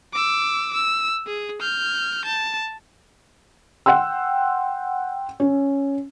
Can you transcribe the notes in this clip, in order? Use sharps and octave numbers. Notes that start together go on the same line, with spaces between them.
D6 E6
E6
G#4
F6 G6
A5
F#5 G5 C6 E6
C#4